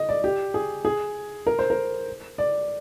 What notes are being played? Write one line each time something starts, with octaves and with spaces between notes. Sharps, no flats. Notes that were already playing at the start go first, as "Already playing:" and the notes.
Already playing: D#5
D5
G4
G#4
G#4
A#4
C5
A#4
D5